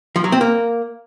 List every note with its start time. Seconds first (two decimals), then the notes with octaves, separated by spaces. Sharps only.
0.16 F3
0.24 F#3
0.32 C4
0.41 A#3